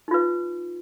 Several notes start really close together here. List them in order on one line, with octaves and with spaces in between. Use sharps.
D#4 F4 B4